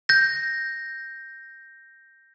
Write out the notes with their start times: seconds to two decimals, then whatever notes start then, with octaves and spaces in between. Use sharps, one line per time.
0.09 G6 A#6